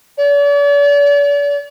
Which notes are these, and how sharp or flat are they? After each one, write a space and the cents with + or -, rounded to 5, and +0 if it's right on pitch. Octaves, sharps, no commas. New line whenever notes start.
D5 -45